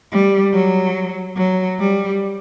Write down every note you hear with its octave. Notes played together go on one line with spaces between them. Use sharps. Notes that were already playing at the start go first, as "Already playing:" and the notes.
G3
F#3
F#3
G3